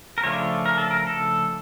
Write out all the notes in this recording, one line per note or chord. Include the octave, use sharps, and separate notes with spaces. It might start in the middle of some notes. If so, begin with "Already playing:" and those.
A#4
C#3 F3 A3 D4 F4 C#5
A#4
A4
A#4
A4